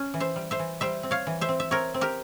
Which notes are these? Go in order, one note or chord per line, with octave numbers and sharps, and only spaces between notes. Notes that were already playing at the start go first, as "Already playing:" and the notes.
Already playing: C#4
E3
C5 E5
G3
C5 E5
E3
G3 C5 E5
C4
C#5 F5
E3
C5 E5
C4
E5
C4 A#4 C#5
C4
G4 A#4